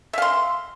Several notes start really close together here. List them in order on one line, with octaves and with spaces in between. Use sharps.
E5 F5 C6